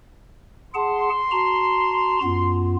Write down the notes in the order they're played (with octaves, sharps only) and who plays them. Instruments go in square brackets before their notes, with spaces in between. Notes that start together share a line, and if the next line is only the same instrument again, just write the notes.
[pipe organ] G#4 F#5 A5 [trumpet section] C6
[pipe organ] F#4 A5 A#5
F#2 B3 F4